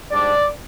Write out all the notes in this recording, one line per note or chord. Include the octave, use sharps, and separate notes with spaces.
G#2 G3 D4 D5